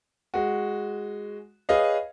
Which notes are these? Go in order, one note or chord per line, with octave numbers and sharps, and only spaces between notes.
G#3 F#4
G#4 B4 C#5 D#5 F5